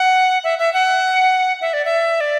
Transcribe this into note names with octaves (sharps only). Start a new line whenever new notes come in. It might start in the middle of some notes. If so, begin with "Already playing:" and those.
Already playing: F#5
E5
E5
F#5
E5
D5
E5
D5